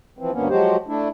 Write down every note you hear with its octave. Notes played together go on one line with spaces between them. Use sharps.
E3 F3 C4
D2 G2 A#3 B3 C#4
F3 F#3 G#3 F#4 G4 C5
A3 D4 E4